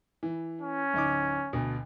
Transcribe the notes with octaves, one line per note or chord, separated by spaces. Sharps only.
E3
C#4
D1 D#4 D6
D2 B2